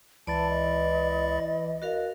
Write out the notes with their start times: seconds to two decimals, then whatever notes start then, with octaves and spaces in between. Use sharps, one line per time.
0.27 C#2 E3 D5 A5 B5 A6
0.50 D#5
1.82 F#4 A#4 F5